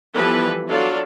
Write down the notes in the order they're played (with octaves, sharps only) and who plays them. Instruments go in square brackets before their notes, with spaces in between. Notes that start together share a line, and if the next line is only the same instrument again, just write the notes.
[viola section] E3 F3 G3 B3 A4 B4
F#3 D4 F4 F#4 A4 D5